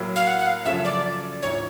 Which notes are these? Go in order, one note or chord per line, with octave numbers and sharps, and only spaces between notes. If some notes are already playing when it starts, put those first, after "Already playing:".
Already playing: A2 F#3 A#3
F5
F#5
F#5
F5
F#2 C#3 F3 A3 C#4 E5
D5
A#1 G#2 E3 C#5